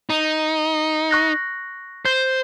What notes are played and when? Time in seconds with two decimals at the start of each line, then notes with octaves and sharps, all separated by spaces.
0.10 D#4
1.11 C#6 F#6 A#6
2.05 C5 G6